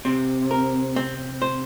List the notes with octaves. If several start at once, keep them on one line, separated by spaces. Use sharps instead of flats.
C3 C4
A#4
C4
C5